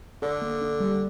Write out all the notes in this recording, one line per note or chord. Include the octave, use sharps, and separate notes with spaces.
D3 A4
A#3
D4
G3